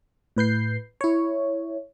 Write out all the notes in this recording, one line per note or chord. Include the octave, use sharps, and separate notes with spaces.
A2 B4 G6 C7
E4 C#5